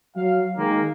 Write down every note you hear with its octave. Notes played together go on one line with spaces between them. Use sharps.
F#3 F5
D#3 G#3 A#3